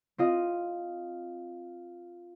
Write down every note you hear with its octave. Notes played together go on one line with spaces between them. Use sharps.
C4 F4 D#5